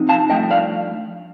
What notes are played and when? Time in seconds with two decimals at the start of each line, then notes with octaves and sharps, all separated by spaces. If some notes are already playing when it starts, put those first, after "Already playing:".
Already playing: F2 C3 F3 C4 D#4
0.09 F5 A5
0.30 G2 F3 A3 D#5 G5
0.51 D5 F5